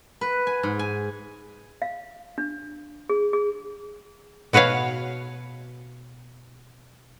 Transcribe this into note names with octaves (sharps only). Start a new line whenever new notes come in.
B4
G#5
G#2
G#5
F5
D4
G#4
G#4
B2 F#4 B4 C#5 F5